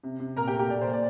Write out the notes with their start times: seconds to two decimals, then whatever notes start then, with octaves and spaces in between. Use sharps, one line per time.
0.03 C3
0.20 C3
0.37 A#2 A#4 A#5
0.48 G4 G5
0.53 A3
0.59 G4 G5
0.70 A#2 D5
0.81 C5
0.87 A#2
0.93 D5